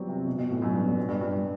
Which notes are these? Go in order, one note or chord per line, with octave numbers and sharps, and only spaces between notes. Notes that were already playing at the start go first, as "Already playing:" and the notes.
Already playing: F#3 G3 B3 C4
C3
B2
B2
A2
F#2
G2
B2
G2
G2